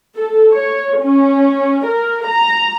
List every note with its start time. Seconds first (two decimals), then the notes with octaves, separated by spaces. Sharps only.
0.16 A4
0.53 C#5
1.00 C#4
1.86 A#4
2.27 A#5